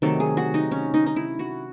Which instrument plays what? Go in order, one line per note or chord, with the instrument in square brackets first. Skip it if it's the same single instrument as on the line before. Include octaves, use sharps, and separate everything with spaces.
[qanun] C3 D#3 F#3 A3 A4
G#4
F#4
D#4
C#4
D#4
D#4
E4
F#4